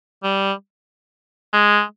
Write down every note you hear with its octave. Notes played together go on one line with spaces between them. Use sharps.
G3
G#3